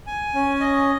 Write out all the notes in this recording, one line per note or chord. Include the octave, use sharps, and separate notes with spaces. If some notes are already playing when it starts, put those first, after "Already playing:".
G#5
C#4
D#5